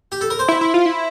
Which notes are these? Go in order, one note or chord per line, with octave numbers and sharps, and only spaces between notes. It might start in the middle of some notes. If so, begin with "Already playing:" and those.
G4
A4
A#4
C5
E4
E4
F4
E4